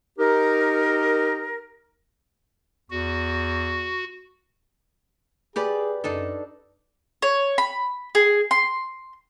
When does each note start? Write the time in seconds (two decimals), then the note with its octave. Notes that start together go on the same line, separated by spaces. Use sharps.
0.19 D#4 G4 A#4
2.90 E2 F#4
5.56 G4 G#4 B4 D5
6.04 F#2 D4 D#4 A4
7.22 C#5
7.58 B5
8.15 G#4
8.51 C6